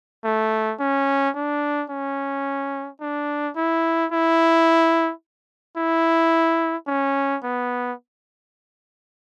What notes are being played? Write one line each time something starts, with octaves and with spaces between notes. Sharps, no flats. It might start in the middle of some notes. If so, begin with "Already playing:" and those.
A3
C#4
D4
C#4
D4
E4
E4
E4
C#4
B3